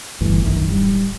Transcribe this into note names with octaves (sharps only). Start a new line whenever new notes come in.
G1 D2 G2 E3
A#1 F#2 D#3
D1 G3